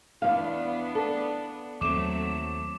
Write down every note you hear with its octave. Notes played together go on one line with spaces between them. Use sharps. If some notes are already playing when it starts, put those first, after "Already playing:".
E2 E3 B3 D4 F5
A4
D#2 F#3 A3 C4 D6 E7